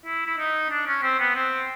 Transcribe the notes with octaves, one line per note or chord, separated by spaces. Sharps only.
E4
E4
D#4
D4
C#4
C4
B3
C4